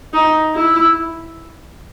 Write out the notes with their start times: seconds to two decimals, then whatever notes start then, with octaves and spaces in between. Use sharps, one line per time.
0.13 D#4
0.55 E4